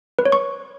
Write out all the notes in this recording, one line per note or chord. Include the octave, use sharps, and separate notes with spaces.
B4
C#5
C#6